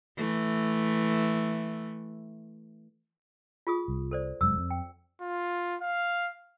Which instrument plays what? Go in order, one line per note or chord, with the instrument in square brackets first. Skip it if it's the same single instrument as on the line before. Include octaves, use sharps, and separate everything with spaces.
[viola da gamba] E3 A3
[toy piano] F4 G#4 D#6
[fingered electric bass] C2
[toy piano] A4 C5 D5
[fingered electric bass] F1 F#2 G#3 [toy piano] E6
[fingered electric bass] F2
[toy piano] G5
[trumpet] F4
F5